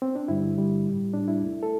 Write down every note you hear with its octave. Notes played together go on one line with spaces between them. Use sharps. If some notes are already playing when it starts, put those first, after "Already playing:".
C4
D4
G2 D3 G3 E4
G2 D3 G3
A2 G3
A2 G3 D4
E4
E2 C3 A3
A4